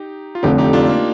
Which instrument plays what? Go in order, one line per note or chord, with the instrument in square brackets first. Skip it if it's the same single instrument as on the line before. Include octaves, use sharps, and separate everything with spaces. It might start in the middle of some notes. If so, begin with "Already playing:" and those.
Already playing: [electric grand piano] D#4 G4
F4
[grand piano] F1 F2 D3 [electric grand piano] D#4 G4
[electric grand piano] D#4 G4
D4 F4
A#3 D4